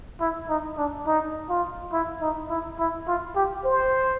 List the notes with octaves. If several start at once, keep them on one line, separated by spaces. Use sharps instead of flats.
E4
D#4
D4
D#4
F4
E4
D#4
E4
E4
F4
G4
C5